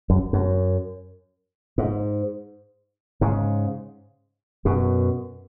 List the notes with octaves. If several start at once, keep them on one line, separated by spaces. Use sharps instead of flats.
F#2
F#2
G#2
G#2 C#3
F#2 B2